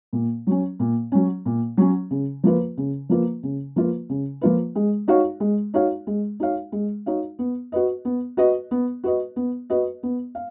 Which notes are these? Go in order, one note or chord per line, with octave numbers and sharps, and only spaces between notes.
A#2
F#3 C#4
A#2
F#3 C#4
A#2
F#3 C#4
C#3
F3 A#3 F4 B4
C#3
F3 A#3 F4 B4
C#3
F3 A#3 F4 B4
C#3
F3 A#3 F4 B4
G#3
D#4 F#4 C#5 F5
G#3
D#4 F#4 C#5 F5
G#3
D#4 F#4 C#5 F5
G#3
D#4 F#4 C#5 F5
B3
F#4 B4 D#5
B3
F#4 B4 D#5
B3
F#4 B4 D#5
B3
F#4 B4 D#5
B3
F5